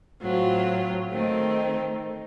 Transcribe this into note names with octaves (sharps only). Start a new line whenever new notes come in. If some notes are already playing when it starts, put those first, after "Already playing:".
A2 F#3 C4 F4
D#3 A3 C4 D#4